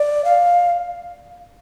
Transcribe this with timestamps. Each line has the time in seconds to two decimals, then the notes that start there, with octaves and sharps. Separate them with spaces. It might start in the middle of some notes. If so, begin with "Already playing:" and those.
Already playing: D5
0.25 F5